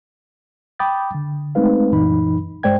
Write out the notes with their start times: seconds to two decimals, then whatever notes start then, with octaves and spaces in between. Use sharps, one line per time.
0.79 G5 B5 D6 D#6 G6 A6
1.15 D3
1.55 G#3 A3 C4 D#4 B4 F5
1.91 C2 F#2 A#2 E3 D#4 B5
2.63 G2 G#3 C5 D5 G5 G#6